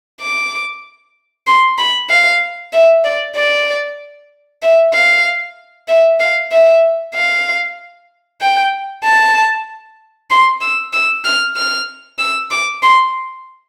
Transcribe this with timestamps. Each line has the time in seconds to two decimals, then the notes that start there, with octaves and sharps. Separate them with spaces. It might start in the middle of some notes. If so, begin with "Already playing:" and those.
0.21 D6
1.47 C6
1.78 B5
2.10 F5
2.73 E5
3.04 D5
3.36 D5
4.63 E5
4.93 F5
5.89 E5
6.20 F5
6.52 E5
7.15 F5
8.41 G5
9.04 A5
10.30 C6
10.61 E6
10.93 E6
11.25 F6
11.56 F6
12.19 E6
12.51 D6
12.83 C6